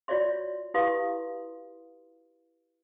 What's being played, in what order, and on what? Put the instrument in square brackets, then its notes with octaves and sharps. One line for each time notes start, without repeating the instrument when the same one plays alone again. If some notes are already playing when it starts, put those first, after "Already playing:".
[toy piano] F4 F#4 C#5 D5 E5 C6
E4 G4 B4 F5 C6 D#6